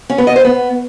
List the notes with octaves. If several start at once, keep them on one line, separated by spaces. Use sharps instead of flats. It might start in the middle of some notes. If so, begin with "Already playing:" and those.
C#4
B3
D#5
C5
B3